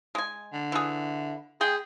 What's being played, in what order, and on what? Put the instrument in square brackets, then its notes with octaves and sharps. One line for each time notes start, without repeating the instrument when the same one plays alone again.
[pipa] G#3 G#5
[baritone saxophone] D3
[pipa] E3 G#4
[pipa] G#3 G5 [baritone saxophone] G#4